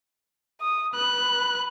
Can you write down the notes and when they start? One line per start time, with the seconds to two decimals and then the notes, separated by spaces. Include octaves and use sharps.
0.61 D#6
0.95 B4 F#6